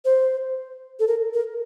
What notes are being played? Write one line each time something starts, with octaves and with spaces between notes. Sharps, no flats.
C5
A4
A#4
A#4